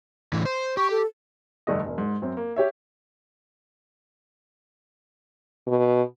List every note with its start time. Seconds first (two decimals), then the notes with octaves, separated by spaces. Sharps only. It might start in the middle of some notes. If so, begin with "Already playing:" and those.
0.33 A2 D3 E3
0.45 C5
0.77 G4 C#6
0.91 A4
1.67 F1 G2 D3 A3 D#5
1.86 E1
1.98 G#2
2.22 F#2 C4
2.37 A#3
2.56 G4 C#5 E5
5.67 B2